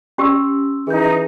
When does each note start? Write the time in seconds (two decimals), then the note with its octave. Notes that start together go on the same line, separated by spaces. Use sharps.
0.18 C#4 G4 C6 E6
0.87 E3 D#4 G#4 G6